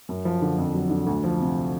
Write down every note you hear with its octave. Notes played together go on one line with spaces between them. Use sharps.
F#2
F3
D3
F2
F#3
D3
D2
F3
C3